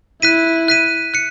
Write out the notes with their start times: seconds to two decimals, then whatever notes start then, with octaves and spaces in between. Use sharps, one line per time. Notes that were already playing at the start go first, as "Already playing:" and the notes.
0.22 E4 F#6 B6 D#7
0.68 F#6 B6 D#7
1.14 F#6 C#7